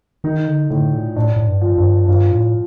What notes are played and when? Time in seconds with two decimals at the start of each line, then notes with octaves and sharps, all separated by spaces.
0.24 D#3 D#4
0.47 D3
0.70 A2 D3
0.93 A#2
1.16 A2 D4
1.36 A2
1.47 G2
1.61 F3
1.78 G2
2.09 G2 F4
2.31 A2